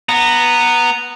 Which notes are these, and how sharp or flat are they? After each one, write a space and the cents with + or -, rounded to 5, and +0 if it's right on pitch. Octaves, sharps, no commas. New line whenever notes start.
B3 +0 A#5 -15